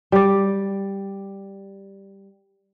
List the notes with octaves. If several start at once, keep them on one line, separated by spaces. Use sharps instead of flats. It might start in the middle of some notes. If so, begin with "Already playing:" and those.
G3 D5